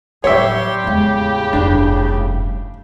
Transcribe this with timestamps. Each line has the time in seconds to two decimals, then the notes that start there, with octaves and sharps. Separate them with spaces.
0.24 A2 F#3 G3 G4 C#5 E5 C6
0.84 E2 A2 C#3 G#3
1.53 F1 G2 D4